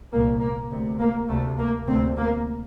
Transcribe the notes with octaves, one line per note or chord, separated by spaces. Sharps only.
C2 A#2 A#3
A#3
D2 C3
A#3
D2 C3 A3
A#3
D2 C3 C4
A#3